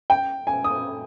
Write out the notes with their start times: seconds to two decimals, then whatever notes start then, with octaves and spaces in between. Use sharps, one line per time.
0.10 G5
0.47 G#5
0.64 D#6